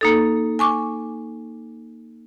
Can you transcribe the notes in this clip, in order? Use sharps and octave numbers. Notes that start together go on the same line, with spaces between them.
A#3 D#4 A4
G#5 C#6 D6